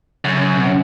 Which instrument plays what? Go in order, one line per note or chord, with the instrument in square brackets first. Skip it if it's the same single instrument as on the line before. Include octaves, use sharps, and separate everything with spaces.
[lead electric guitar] F#2 [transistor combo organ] C#3
[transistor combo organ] C3
C#3